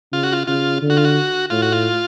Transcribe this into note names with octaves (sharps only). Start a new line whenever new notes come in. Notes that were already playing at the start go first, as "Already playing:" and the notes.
C#3 F4
F#4
F4
C#3 F4
D3
F#4
F4
F#4
A2 F4
F#4
F4